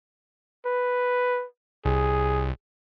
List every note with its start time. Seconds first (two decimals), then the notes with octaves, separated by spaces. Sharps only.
0.66 B4
1.85 C2 G#4